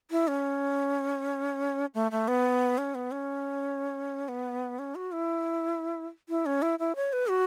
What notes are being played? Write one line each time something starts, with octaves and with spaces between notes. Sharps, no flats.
E4
C#4
A3
A3
B3
C#4
B3
C#4
B3
C#4
F#4
E4
E4
C#4
E4
E4
C#5
B4
F#4